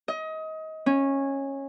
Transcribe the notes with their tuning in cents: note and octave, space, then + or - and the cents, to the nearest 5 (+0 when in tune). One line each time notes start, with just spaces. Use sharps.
D#5 +25
C#4 -15